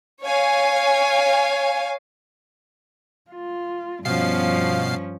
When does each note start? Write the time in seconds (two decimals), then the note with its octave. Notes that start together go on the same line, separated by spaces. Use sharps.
0.22 C#5 F5 G#5
3.31 F4
4.05 G2 B2 F3 C#4 F5 C7